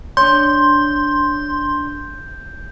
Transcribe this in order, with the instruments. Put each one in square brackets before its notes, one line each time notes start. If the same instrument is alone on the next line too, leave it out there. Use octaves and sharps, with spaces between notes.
[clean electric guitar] D4 C#5 [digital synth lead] C6 [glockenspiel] G6